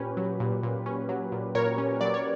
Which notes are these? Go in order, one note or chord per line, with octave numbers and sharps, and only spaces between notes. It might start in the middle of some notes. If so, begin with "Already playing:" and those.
Already playing: A#2 C#4 G4 B4
F#3
A#2
A#2
C#4
F#3
A#2
A#2 A#4 C#5
C#4
F#3 D5
C#5